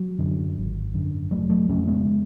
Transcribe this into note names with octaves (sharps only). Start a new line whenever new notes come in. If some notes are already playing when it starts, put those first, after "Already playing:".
Already playing: F#3
F#2 D3
G#1
F#2 D3
F1 F#3 A3
F#3 A3
F2 C#3 A3 C#4
G#3 B3